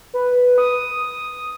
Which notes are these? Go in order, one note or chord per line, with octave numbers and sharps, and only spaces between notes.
B4
D#6